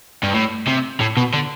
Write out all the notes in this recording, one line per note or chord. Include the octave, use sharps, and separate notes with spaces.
G2
A2
C3
A2
B2
D3